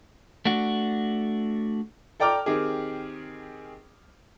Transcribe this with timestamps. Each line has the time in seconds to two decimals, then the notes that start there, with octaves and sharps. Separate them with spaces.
0.45 A3 D4 F#4
2.20 A4 D5 G5 A#5 D6 F6
2.46 D#3 C4 G4 G#4